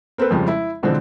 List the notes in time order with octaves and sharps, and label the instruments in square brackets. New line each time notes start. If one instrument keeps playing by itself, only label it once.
[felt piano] A#3 C4 A4 B4
F2 C#3 F3 G3 G#3
E4
B2 D3 E3 F3 G#3 C4